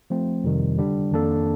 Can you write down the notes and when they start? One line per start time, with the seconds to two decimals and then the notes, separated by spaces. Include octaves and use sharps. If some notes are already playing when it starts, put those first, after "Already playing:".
0.10 F3 A3 C4
0.44 F2 C3 D#3 G3
0.77 D3 G3 D4
1.11 F2 D#3 A#3 D4 A4